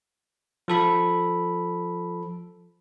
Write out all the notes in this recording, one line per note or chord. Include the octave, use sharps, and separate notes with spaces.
F3 A4 B5